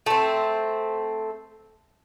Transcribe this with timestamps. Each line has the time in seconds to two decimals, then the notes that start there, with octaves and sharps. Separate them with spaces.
0.06 A3 C4